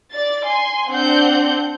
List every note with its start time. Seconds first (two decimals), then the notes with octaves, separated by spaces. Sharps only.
0.12 D5 A6
0.45 G#5 C6
0.90 C4 D4 F#5 G6